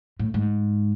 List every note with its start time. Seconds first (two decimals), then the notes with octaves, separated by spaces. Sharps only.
0.19 A2
0.34 G#2